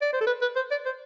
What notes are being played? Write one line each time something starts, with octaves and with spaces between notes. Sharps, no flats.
D5
C5
A4
B4
B4
C5
D5
C5